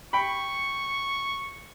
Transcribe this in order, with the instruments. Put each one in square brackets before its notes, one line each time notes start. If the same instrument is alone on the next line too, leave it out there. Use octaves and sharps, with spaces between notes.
[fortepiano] G5 B5 [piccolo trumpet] C#6